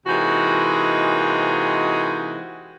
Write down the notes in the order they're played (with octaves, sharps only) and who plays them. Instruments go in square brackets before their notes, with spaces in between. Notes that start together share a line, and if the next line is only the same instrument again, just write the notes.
[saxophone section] C3 E3 G#3 A#3 D#4 F#4